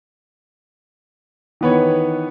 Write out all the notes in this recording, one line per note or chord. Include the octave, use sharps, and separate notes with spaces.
D#3 E3 B3 B4 C#5